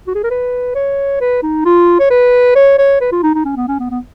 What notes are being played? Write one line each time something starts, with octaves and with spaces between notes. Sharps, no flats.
F#4
G#4
A#4
B4
C#5
B4
D#4
F4
C#5
B4
C#5
C#5
B4
F4
D#4
D#4
C#4
B3
C#4
B3
B3